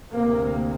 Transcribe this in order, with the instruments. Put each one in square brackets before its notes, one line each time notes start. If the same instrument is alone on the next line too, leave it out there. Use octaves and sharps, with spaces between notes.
[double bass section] D2 C3 A#3